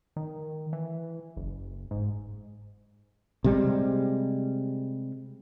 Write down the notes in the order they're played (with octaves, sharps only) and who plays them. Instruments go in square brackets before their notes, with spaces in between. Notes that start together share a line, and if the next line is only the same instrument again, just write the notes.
[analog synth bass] D#3
E3
F#1
G#2
[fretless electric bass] C3 G3 G#3